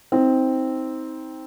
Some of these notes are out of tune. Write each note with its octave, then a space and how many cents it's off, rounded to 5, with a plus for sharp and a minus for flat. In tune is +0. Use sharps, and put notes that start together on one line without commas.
C4 +0 D#4 +30